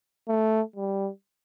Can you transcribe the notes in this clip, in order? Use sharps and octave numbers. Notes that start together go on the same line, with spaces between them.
A3
G3